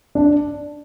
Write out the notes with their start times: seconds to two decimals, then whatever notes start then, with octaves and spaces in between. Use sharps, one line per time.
0.15 D4